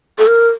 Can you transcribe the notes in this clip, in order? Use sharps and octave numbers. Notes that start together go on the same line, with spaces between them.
A4
A#4